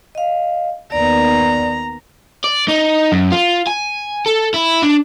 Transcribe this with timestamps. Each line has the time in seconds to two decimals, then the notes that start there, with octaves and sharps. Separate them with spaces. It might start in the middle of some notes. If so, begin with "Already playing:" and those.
0.15 D#5 F5
0.92 D#2 D#3 B3 D5 A#5
2.44 D5
2.68 D#4
3.12 F#2
3.32 F4
3.67 G#5
4.26 A4
4.54 E4
4.82 D4